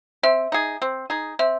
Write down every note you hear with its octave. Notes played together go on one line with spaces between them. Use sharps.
C4 E5
D#4 G#4
C4
D#4 G#4
C4 E5